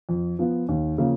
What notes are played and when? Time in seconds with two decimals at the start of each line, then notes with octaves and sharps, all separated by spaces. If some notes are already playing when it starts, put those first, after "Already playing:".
0.09 F2
0.39 F3 B3 F4
0.68 D#2
0.98 C#3 F3 A#3